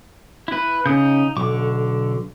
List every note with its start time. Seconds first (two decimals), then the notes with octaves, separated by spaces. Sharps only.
0.48 E4 B4
0.86 C#3 D#4 D#6 G6
1.37 B1 D3 C#6 D6